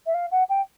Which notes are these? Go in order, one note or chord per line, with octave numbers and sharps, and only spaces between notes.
E5
F5
F#5
G5